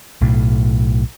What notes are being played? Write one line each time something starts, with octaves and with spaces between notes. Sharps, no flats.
B1 A2